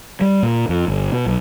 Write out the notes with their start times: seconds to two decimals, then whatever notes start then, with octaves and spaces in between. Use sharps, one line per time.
0.21 G3
0.43 A#2
0.69 F2
0.88 G1
1.12 B2
1.26 B1